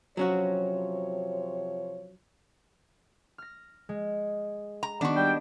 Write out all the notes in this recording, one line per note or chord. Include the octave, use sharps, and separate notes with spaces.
C3 F3 F#3 C#4 F#4 C#5
F6 A#6
G#3
A#5
D#3 B3 D4 F#4
G3 G5